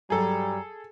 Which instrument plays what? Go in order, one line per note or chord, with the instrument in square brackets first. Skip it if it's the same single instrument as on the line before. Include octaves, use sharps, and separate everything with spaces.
[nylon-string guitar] G2 F#3 [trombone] G3 [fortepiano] G#4 A4 [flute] A#5